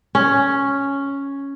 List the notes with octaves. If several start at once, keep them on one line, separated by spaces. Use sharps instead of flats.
C#4